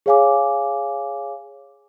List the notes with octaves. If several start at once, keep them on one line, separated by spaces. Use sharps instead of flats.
G#4 C#5 F5 G#5 D6